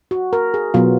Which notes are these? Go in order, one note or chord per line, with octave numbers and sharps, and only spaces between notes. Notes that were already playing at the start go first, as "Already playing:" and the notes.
F#4
A#4
G#4
B2 F#3 B3 F4